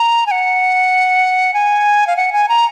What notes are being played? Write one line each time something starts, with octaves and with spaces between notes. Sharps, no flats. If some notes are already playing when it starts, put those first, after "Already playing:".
Already playing: A#5
G#5
F#5
G#5
F5
F#5
G#5
A#5